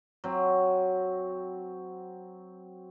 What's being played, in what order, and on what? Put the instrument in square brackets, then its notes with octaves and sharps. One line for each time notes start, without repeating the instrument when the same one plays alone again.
[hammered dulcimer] F#3 C4